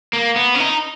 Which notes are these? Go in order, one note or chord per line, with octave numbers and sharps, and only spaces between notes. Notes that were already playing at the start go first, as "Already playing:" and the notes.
A#3
B3
C#4
D#4